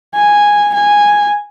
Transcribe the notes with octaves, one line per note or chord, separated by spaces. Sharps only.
G#5
G#5